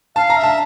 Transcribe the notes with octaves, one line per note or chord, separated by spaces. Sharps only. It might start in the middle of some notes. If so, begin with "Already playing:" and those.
F5 A5
A#5
E5
A5